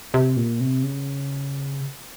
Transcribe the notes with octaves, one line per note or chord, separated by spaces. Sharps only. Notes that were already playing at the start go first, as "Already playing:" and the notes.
C3
A#2
C3
C#3